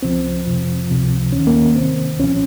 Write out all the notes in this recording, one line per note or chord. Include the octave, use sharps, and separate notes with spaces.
C#2 C#3 F3 C4
F2 C3 F3
C#2 C3 F3
D#2 D#3 C#4
A#3
C2 C3 D#3 C4
C2 A#2 F3 C#4